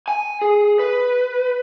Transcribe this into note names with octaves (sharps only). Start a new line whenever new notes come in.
G#5
G#4
B4